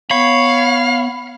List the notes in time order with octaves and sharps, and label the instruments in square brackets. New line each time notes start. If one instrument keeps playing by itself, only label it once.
[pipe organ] B3 [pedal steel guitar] C#5 [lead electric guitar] F5 [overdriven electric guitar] B5